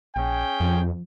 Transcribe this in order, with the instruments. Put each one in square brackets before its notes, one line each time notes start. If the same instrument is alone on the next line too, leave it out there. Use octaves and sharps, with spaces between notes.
[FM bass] A#1 [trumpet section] C#4 G#4 G5
[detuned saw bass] F2 [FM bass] F3